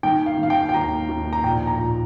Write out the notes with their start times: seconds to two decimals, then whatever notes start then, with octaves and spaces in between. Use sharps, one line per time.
0.03 D#3 G5
0.26 F5
0.38 D#3
0.43 F5
0.50 G5
0.69 G5
0.74 D#2 A#5
1.09 D#2
1.33 A#5
1.44 A#1 G5
1.67 A#5
1.79 A#2